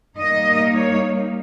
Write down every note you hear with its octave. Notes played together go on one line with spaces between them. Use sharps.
G3 A#3 D#4 D#5
C#5